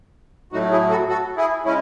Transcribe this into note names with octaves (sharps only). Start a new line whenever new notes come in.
A2 F#3 A3 D#4 F#4
E4 G#4
F#4 A4
F#4 A4
E4 G#4
C#3 G#3 C#4 E4